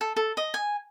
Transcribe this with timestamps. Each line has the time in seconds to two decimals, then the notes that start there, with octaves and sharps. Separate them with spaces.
0.01 A4
0.16 A4
0.37 D#5
0.54 G#5